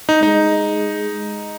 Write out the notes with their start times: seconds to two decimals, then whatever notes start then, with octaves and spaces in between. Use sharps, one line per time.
0.09 D#4
0.22 G#3 D#4